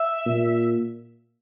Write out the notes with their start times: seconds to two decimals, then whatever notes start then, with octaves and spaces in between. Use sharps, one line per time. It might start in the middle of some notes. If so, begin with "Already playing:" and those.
Already playing: E5
0.26 A#2